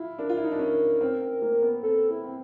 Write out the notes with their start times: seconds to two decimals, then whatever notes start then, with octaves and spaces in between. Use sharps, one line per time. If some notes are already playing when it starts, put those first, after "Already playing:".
Already playing: E4 F4
0.18 D4 A#4
0.29 F4
0.37 E4
0.44 D#4
0.51 D4
0.59 C#4
1.01 C4
1.22 C4
1.42 A#3
1.62 B3
1.83 C4 A4
2.11 E4
2.24 C4